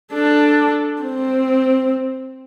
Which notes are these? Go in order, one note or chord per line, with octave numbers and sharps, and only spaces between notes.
D4 A4
C4